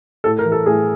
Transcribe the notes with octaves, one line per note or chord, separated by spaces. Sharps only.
A2 A4
A#4
E3
A4
A2 G#4